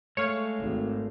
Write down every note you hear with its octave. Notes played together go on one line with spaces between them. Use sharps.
G#3 A3 C#5 F5
G#1